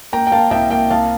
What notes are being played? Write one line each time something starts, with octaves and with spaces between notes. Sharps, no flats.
A#3 G5 A#5
G5
A#3 F5 A5
C2 E5 G5
A#3 E5 G5
C2 F5 A5